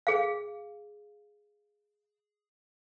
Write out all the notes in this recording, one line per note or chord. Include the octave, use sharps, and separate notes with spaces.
G#4 F5